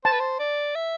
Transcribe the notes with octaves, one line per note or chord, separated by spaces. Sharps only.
C5 A5
B4
C5
D5
E5